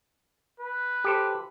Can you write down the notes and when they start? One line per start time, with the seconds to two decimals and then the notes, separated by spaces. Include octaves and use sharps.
0.60 B4
1.04 G4 A4 C5